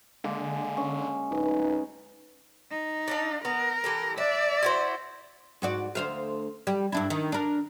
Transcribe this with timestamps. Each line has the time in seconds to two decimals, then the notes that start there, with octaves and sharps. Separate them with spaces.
0.24 D3 G#3 A#3
0.77 C#4
1.31 D1 D#4 B4
2.71 D#4
3.08 D4 E5 F5
3.45 B3 A#4
3.84 E3 G4 A4
4.18 D4 D5 E5
4.63 E4 F#4 C5
5.62 G#2 F#4 D5
5.95 D2 C5 F5
6.67 G3
6.92 G2 D4 E4
7.10 D#3
7.32 D4 A#4